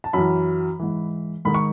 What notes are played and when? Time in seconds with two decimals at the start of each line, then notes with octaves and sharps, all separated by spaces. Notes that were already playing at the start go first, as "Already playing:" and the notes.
0.04 A5
0.13 F#2 E3 B5
0.79 G#2 E3
1.45 G#2 D#3 B5
1.54 C#6